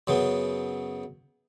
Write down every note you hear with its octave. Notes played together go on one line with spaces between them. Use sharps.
F#2 C#3 B3